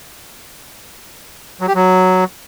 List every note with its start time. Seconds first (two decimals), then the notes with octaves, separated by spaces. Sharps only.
1.61 F#3
1.68 G4
1.75 F#3